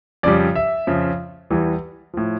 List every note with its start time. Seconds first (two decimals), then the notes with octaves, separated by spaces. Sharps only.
0.23 F2 C#3 G3 D5
0.55 E5
0.87 F2 C#3 F3
1.50 E2 E3 G3
2.14 A2 F3